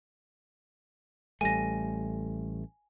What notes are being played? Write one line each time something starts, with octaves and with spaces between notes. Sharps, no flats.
A1 G3 A3 G#5 A#6